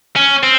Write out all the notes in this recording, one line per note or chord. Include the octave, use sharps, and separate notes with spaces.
C#4
C4